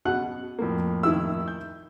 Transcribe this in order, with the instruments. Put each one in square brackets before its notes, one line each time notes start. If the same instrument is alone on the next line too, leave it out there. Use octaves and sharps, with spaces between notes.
[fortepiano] B2 F#5 F#6
[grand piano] F2 A2 A#3
[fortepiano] D#3 E4 E6
[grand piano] G6